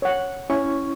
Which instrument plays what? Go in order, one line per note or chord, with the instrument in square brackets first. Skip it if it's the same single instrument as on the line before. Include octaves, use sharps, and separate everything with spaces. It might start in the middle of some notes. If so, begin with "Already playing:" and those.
[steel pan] C#5 F#5
[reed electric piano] C#4 E4 C#6